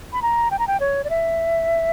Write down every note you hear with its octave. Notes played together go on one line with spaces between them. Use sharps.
B5
A#5
G5
A#5
G5
C#5
D5
E5